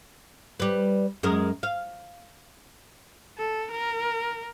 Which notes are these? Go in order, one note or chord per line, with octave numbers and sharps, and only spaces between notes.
G3 B4
F#2 G#3 A#4
F5
A4
A#4